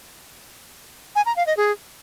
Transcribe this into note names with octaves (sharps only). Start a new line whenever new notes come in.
G#5
A#5
F5
D#5
G#4